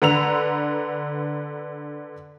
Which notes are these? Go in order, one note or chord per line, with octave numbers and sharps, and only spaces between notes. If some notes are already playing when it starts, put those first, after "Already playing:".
D3 B4 F#5 A#5 E6 F7